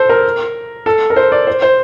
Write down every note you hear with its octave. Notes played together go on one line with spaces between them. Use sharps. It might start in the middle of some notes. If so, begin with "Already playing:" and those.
Already playing: A4 C5
A#4
A4
A#4
C5
D5
C5
C5